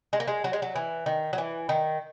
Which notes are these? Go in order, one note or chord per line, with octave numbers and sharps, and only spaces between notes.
G#3
A#3
G#3
F#3
G#3
F#3
E3
D#3
F#3
E3
D#3